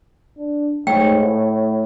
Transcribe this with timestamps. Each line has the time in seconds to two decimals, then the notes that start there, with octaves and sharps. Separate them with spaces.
0.38 D4
0.87 G#2 A3 C#5 G5
1.21 A2